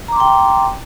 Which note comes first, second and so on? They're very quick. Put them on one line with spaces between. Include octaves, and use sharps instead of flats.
A#5 D6 C6 G5